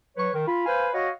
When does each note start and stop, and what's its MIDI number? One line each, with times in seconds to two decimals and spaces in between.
0.17 0.29 54
0.17 0.29 71
0.17 0.29 73
0.17 0.29 85
0.33 0.46 51
0.47 0.63 65
0.47 0.63 83
0.66 0.88 71
0.66 0.88 72
0.66 0.88 77
0.66 0.88 80
0.93 1.09 66
0.93 1.09 73
0.93 1.09 75
0.93 1.09 77